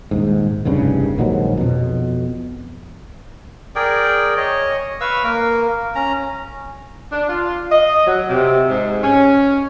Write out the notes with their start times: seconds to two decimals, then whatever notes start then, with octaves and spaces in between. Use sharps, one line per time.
0.11 D#1 G#2
0.65 F1 C2 G2 C#3
1.18 A#1 D#2 G#2 F#3
1.57 F2 B2
3.76 G#4 A#4 D5 G5
4.37 C#5 D#5
5.01 B4 F5 C#6 E6
5.23 A#3 A#4
5.95 C#4 A#5
7.12 D4
7.29 F4
7.72 D#5
8.07 F#3
8.29 C3
8.69 G#2
9.03 C#4